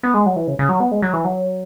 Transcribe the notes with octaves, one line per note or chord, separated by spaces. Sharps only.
B3
G#3
F#3
E3
C#3
C#3
F#3
B3
G#3
F#3
E3
F#3